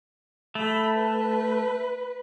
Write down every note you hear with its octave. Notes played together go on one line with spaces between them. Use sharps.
A3 B5
B4